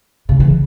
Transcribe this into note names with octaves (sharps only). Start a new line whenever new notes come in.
C#3
E3